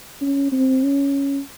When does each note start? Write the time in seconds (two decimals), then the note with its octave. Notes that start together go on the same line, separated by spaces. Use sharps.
0.21 C#4
0.52 C4
0.83 C#4